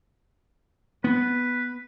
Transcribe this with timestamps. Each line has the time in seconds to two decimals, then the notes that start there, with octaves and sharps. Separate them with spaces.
1.04 B3 B4